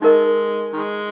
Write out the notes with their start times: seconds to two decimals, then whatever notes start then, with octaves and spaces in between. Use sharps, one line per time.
0.02 D#3 G#3 D#4 A#4 D#5
0.73 D#3 G#3